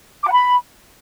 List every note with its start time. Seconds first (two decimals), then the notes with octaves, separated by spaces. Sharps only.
0.22 D6
0.27 F#5
0.32 B5